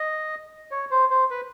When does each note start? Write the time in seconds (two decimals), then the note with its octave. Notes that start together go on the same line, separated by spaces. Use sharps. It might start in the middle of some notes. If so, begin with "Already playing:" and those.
Already playing: D#5
0.71 C#5
0.91 C5
1.10 C5
1.30 B4